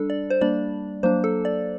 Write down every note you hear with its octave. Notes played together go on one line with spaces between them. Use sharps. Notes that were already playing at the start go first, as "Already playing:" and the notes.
Already playing: G3 D4 A4
D5
C5
G3 A#3 D4 D5
F#3 A#3 D4 C5
A4
D5